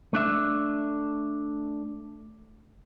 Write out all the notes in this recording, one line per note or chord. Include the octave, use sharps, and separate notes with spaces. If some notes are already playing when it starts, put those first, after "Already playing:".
A3 D4 E5